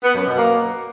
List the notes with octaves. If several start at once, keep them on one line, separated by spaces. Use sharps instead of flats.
B3
F#2
B2
A#3